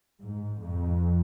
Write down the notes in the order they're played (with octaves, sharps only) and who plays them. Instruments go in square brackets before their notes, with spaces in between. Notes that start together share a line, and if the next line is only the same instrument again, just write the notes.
[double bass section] G#2
F2